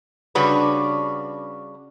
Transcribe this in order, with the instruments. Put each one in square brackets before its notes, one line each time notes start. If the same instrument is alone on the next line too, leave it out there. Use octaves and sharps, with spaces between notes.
[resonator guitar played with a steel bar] C#3 G3 C#4 D4 F#4 B4